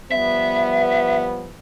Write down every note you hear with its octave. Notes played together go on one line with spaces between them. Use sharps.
F3 G3 B3 E5